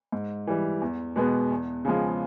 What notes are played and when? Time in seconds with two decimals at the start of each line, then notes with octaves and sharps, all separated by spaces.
0.12 G#2
0.47 E3 G3
0.81 E2
1.16 B2 G#3 B3
1.51 E2
1.85 C#3 F3 G#3